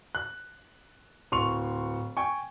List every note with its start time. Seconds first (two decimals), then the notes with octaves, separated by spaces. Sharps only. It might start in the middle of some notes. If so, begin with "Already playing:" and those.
0.15 F#6
1.32 D1 C6 C#6 F7
2.17 G5 G#5 C#6